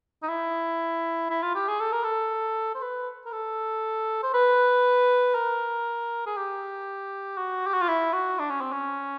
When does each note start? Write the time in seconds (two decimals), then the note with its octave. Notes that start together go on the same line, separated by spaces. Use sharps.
0.22 D#4
0.28 E4
1.30 E4
1.42 F4
1.55 G4
1.68 G#4
1.80 A4
1.92 A#4
2.04 A4
2.75 C5
2.82 B4
3.26 A#4
3.32 A4
4.23 C5
4.34 B4
5.35 A#4
6.26 G#4
6.37 G4
7.37 F#4
7.66 G4
7.74 F#4
7.81 F4
7.88 E4
8.13 F#4
8.39 D4
8.50 C#4
8.61 C4
8.72 C#4